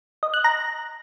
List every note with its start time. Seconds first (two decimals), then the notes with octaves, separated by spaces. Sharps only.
0.23 D#5
0.34 F#6
0.44 A#5